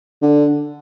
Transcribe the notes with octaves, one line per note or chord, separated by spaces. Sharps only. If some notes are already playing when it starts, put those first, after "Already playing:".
D3